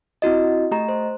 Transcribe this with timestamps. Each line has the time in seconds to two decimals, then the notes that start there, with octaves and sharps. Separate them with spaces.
0.22 C4 E4 F#4 D#5
0.71 A3 G4 D#5 A#5
0.89 C5